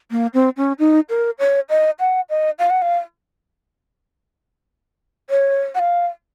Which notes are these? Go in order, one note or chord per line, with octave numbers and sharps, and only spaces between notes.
A#3
C4
C#4
D#4
A#4
C#5
D#5
F#5
D#5
F5
F#5
F5
C#5
F#5
F5